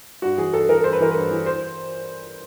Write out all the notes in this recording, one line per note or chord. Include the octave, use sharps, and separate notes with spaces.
G2 F#4
E3 G#4
G2 A4
E3 A#4
G2 C5
B4
E3 A#4
G2 B4
E3
C5